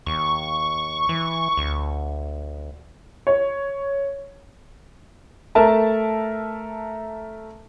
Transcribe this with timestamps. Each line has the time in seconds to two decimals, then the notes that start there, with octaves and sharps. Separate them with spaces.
0.06 D#2 C#6
1.09 E3
1.57 D2
3.27 C#5
5.55 A3 A#4 E5 A5